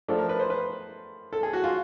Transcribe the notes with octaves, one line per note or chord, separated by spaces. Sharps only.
F3 A3 D4 A4
A#4
B4
C5
B4
A4
G#4
F#4
F4